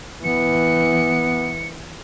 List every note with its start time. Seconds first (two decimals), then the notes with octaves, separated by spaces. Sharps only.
0.24 E3 B3 C#7